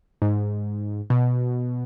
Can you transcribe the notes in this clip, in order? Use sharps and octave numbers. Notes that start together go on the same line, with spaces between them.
G#2
B2